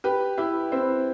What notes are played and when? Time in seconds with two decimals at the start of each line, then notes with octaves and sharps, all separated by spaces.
0.04 G4 B4
0.38 E4 G4
0.72 C4 E4